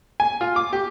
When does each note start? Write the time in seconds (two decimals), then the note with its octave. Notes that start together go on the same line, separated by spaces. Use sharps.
0.20 G#5
0.41 F4
0.56 D6
0.73 G4